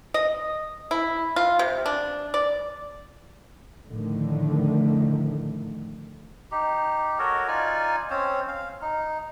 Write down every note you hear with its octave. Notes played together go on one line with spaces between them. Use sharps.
D#5
E4
F4
C3
D4
D5
F2 A2 D3 D#3 A3
D#4 G4
F#4 A4 A#4 C#5
D#4 F4 D5 G#5
C4 C#4 C5 C#5
F5
D#4